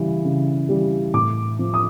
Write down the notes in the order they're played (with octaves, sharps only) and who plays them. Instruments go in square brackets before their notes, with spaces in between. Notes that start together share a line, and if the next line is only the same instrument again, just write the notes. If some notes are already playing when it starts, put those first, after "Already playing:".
Already playing: [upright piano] C#3 E3 G3
C#3
E3 G3
A2 D6
F3
D#6